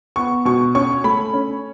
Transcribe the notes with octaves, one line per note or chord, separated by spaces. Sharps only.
B3 C#6
B2 C#6
C#4 C#6
A3 B5
C#4